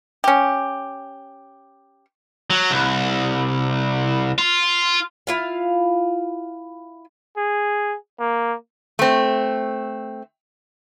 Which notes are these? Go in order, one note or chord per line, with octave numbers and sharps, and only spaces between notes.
C#4 G4
F#3
C2
F4
E4 F4 F5
G#4
A#3
A3 C4